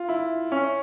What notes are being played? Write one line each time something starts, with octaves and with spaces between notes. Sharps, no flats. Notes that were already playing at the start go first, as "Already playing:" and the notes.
Already playing: F4
E4
C#4